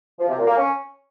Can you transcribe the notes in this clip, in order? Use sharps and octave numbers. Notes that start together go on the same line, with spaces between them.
F3
C3
A#2
A#3
C#4